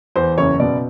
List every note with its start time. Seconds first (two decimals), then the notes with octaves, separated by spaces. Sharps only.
0.16 E2 C5
0.38 F#1 C#5
0.60 B2 D5